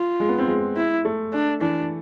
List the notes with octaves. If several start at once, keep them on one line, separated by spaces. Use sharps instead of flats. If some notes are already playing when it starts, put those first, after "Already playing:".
Already playing: F4
G#3
B3
C4
G#3
E4
A3
D4
E3 D4